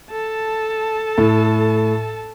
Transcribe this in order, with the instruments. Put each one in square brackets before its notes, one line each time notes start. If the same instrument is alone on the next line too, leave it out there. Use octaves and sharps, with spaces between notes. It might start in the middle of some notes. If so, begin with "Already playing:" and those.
[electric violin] A4 A5
[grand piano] A2